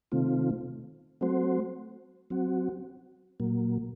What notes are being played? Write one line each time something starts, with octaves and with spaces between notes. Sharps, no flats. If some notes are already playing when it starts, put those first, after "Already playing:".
C3 D#3 A3 C4 F4
F#3 A3 C4 F#4 C5
F#3 C4 F#4
A#2 F#3 A#3